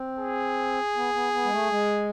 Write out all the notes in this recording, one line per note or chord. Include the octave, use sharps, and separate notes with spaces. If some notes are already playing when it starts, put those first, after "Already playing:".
Already playing: C4
G#4
B3
B3
B3
G#3
A3
G#3